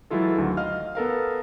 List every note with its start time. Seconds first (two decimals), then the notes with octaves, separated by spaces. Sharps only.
0.10 E3 F#3 G#3 E4 F4 A4
0.38 D2 D#3 F#3
0.57 D#5 F5 F6
0.95 B3 A4 A#4 F5